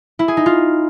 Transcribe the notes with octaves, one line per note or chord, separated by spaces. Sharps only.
E4
G#4
D#4
F4